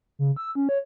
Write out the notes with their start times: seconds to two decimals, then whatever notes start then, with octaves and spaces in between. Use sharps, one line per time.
0.19 C#3
0.37 E6
0.55 C#4
0.69 C#5